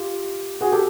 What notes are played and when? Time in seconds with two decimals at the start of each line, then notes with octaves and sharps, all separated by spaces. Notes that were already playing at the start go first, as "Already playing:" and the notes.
Already playing: F4 G4
0.61 F#4 G#4
0.72 G4 A4